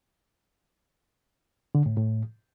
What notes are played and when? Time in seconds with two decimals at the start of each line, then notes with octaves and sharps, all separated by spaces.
1.75 D3
1.86 A2
1.97 A2